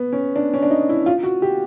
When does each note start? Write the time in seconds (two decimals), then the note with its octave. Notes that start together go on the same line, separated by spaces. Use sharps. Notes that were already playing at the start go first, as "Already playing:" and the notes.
Already playing: B3
0.13 C#4
0.36 D4
0.54 C#4
0.63 D4
0.71 D#4
0.89 E4
1.06 F4
1.23 F#4
1.42 G4